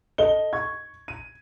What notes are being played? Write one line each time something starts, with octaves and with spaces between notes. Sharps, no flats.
A4 D#5 G7
C#6 G#6
D#7